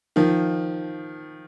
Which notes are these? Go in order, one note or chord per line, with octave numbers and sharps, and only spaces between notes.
D#3 F3